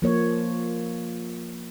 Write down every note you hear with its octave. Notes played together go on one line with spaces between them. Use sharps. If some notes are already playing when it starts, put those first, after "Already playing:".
F3 A#3 C#5